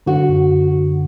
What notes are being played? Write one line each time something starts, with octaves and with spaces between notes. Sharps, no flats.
D3 F#4
F#2